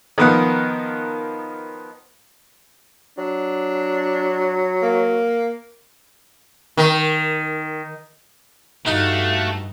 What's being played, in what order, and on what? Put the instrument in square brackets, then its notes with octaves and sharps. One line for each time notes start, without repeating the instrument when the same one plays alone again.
[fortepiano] D#3 F3 B3 A#4 F#5 D#6
[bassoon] F#3 [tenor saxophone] D4
[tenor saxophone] A#3
[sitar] D#3
[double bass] G2 [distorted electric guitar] A3 [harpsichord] D#4 [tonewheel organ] F#4 F5 F#5